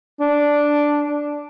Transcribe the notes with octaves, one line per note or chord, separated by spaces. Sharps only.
D4